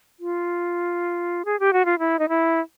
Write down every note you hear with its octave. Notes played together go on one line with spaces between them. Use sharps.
F4
G#4
G4
F#4
F4
E4
D#4
E4